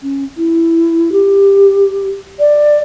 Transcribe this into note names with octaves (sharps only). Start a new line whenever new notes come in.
C#4
E4
G4
D5